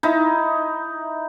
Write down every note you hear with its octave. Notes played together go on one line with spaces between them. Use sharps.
D#4 E4